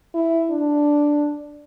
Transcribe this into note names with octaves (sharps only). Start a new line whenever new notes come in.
E4
D4